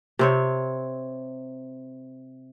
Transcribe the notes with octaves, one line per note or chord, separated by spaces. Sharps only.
C3 C4 C#5